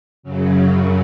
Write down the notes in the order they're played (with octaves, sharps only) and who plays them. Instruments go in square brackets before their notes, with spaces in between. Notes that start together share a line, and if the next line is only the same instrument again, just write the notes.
[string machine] F#2 C#3 F#3